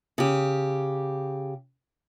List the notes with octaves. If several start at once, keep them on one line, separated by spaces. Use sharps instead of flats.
C#3 G4